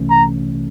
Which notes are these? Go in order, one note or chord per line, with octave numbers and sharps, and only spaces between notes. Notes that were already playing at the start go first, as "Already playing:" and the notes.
Already playing: C2 C3 E3 A3 C#4
A#5